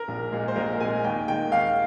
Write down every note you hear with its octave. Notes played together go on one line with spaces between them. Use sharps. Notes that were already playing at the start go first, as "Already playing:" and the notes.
Already playing: A#4
A#1
A#2 G#3
C5
A#1 A#4
A#2 G#3 G#5
D#2 G5
D#3 G#3 G5
D#2 F5